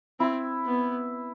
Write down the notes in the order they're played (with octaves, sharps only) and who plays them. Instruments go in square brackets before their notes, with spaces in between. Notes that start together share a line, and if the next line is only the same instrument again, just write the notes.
[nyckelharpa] C4 [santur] E4
[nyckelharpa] B3